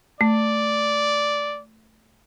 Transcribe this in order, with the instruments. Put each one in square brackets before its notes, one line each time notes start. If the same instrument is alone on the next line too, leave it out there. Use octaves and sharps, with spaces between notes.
[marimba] A3 [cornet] D5